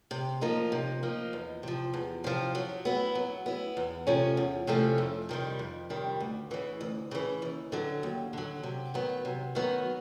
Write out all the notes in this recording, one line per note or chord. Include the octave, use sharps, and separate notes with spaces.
C3
F3 A#3 D#4
C3
F3 A#3 D#4
E2
C3 F3
E2
C3 F3
F#3
B3 E4
F#3
B3 E4
E2
C3 F3 A3 C#4
E2
C3 F3 A3 C#4
F2
C3 D#3 G3
F2
C3 D#3 G3
D2
C#3 E3
D2
C#3 E3
D#2
D3 F#3
D#2
D3 F#3
C3
D#3 F#3 B3
C3
D#3 F#3 B3